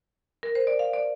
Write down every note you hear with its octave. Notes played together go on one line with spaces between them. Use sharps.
A#4
C5
D5
F5
D5